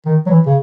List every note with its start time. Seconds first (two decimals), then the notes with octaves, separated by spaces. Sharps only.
0.06 D#3
0.26 F#3
0.30 E3
0.46 C#3